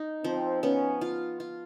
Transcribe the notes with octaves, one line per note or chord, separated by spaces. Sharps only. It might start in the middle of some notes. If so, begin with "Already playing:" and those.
Already playing: D#4
F3 C4
B3 C#4
F4
F4